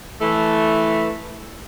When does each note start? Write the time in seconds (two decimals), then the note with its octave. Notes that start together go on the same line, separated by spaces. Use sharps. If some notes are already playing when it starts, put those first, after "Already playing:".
0.21 E3 A3